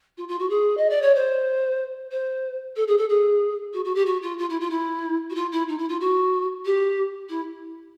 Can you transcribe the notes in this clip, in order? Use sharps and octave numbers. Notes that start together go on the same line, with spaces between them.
F4
F4
F#4
G#4
D#5
D5
C#5
C5
C5
A4
G#4
A4
G#4
F#4
F#4
G4
F#4
F4
F4
E4
F4
E4
F#4
F4
E4
D#4
E4
F4
F#4
G4
E4